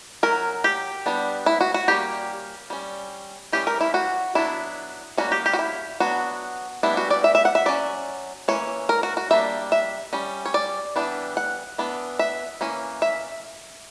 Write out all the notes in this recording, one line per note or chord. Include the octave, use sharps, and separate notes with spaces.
F#3 C#4 A#4
G4
G3 B3 D4
E4
F#4
F#4
G3 A#3 C#4 G4
G3 C#4
E3 G3 C#4 G4
A#4
E4
F#4
F#3 B3 D4 E4
G3 A#3 C#4 F#4
G4
G4
F#4
E4
F#3 B3 D4 F#4
E3 G3 B3 D4 E4
F#4
D5
E5
E5
F#5
E5
F#3 C#4 D5
E3 A#3 C#4 C#5
A#4
F#4
F#4
G3 A#3 D4 E5
E5
G3 C#4
C#5
D5
E3 G3 B3 D4
F#5
E3 B3 D4
E5
E3 A#3 C#4
E5